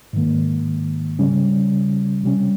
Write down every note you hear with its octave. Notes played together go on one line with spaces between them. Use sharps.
G#2 D#3 A#3
C#3 G3 C#4
C3 G3 C#4